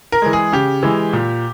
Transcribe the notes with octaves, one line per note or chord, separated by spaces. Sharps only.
A#4
E3 G#3
G#4
C#3 G4
E3 G#3
A#2